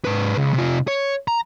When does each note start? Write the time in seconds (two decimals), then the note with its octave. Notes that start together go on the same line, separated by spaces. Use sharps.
0.05 G#2 B4
0.36 C#2
0.54 C3 F4
0.88 C#5
1.28 A#5